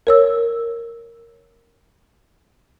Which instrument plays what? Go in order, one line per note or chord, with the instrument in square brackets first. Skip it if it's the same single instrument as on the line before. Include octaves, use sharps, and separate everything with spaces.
[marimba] A#4 C#5 E6